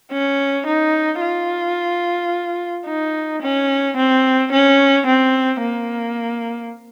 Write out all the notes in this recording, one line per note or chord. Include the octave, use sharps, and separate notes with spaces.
C#4
D#4
F4
D#4
C#4
C4
C#4
C4
A#3